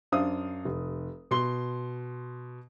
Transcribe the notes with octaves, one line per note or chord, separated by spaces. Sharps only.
F#2 D4 C5 F5 D#6
F1
B2 C6 G7